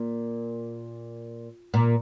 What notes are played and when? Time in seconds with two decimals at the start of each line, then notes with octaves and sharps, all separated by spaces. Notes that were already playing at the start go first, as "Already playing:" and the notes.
Already playing: A#2
1.74 A#2